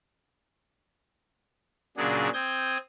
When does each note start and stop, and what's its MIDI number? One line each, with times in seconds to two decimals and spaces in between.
1.97 2.29 46
1.97 2.29 49
1.97 2.29 54
1.97 2.29 62
1.97 2.29 68
2.34 2.78 60
2.34 2.78 87
2.34 2.78 91
2.34 2.78 92